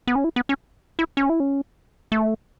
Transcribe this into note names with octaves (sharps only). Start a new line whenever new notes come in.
B3
C#4
E4
B3
C#4
E4
C#4
E4
C#4
A3